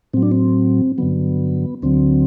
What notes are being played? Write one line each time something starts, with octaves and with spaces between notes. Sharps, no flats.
A2 F#3 C4
D4
C4
G2 D3 F#3 B3
D2 D3 F#3 C4